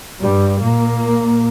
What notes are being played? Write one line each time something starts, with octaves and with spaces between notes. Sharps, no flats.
G2 G3
A#2 A#3